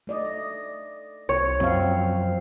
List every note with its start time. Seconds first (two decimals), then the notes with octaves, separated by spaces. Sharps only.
0.07 A3 D5 D#5
1.29 C2 C#5
1.61 F#2 F3 F#3 C4 F5